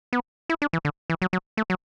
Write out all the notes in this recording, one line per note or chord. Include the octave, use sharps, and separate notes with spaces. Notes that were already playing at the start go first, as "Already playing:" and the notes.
B3
E4
D4
E3
D3
E3
F#3
F#3
A3
F#3